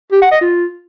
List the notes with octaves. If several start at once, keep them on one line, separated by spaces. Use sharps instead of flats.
G4
F#5
D#5
F4